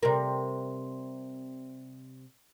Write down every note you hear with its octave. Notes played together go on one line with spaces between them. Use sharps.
C3 G3 A#4